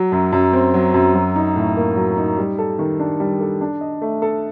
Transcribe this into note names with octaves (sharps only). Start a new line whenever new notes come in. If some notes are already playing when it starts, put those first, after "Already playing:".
Already playing: F#3
F#2
F#2
C4
F#3
F#2
F#3
D#4
A2
A#3
F#3
D#4
G3
A4
D#3
D4
G3
A4
D4
D#5
A3
A4